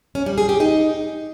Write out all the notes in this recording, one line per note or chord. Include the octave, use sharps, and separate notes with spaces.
C#4
G3
G#4
G4
D#4